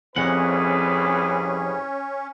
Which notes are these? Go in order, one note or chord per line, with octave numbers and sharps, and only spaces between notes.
C2 F2 C#4 G#4 B4 F#5